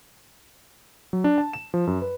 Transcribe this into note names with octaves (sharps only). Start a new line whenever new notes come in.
F#3
D4
A5
E7
F3
F#2
B4